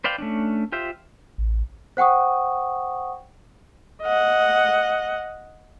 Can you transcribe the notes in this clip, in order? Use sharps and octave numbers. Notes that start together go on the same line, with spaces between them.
B4 C5 D5 F5 G5
A3 C#4 D4
F4 G4 C5 E5
A1
C5 F#5 G5 C#6 D#6
D#5 F#5